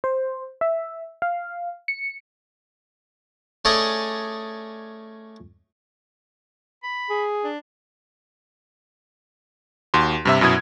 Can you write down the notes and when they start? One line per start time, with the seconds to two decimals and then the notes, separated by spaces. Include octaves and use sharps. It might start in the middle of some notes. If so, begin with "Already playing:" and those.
0.04 C5
0.61 E5
1.22 F5
1.88 C#7
3.65 A3 C#4 G#4 D5 D#5 A5
6.83 B5
7.10 G#4
7.44 D4
9.94 D#2 F#4 C6
10.25 G2 C3 E5
10.41 F#2 B2 E4 D#6 G#6